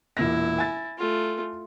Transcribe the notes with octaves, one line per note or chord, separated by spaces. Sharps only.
E1 A#2 E4 A#6
G#5 A6
A3 F4